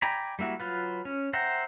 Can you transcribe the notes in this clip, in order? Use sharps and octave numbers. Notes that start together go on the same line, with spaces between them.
D5 G5 G#5 A#5 B5
G3 A#3 E4 F#4
F#3 F4 B4
C#4
C5 E5 F#5 G5 A#5